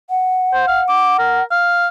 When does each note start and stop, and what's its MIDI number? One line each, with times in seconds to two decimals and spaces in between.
0.10 1.43 78
0.53 0.67 72
0.68 0.81 77
0.89 1.17 86
1.19 1.42 70
1.51 1.87 77